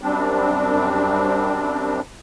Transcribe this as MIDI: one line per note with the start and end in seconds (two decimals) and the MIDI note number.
0.02 2.00 42
0.02 2.00 55
0.02 2.00 60
0.02 2.00 62